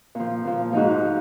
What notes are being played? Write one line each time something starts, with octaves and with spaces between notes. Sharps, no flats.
A#2 F3
A#2 F3
G#2 F3 D#4 F#4
F3